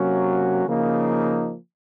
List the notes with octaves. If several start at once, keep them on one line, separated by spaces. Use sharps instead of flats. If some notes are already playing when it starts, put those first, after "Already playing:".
Already playing: C3 F#3 A#3 C#4 F#4
C#3 F3 A#3 D#4